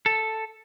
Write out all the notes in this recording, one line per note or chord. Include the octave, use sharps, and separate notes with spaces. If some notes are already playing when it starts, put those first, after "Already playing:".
A4